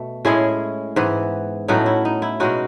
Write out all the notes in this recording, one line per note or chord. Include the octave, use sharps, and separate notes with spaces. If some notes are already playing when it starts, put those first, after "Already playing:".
Already playing: B2 A3
A2 G#3 C#4 E4 G#4
G#2 E3 B3
A2 F#3 A3 C#4 D#4 F#4
E4
D#4
E4
B2 G#3 C#4 D#4 F#4